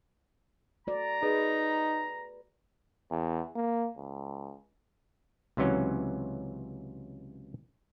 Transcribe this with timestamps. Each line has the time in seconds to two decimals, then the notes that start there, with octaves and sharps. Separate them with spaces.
0.87 A3 F#4 D5 A#5
1.23 D#4 G#4 B4
3.11 E2
3.55 A#3
3.97 C#2
5.57 C#2 C3 E3 F#3 C#4